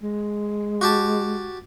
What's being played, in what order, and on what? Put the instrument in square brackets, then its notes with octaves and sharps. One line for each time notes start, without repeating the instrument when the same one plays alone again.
[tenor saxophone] G#3
[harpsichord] F#4 G4 A5